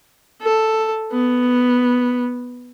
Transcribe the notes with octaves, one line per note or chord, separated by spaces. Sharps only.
A4
B3